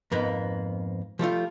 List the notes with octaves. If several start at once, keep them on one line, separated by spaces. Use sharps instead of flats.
F2 G#2 A#3 B3
F3 G3 A3 F4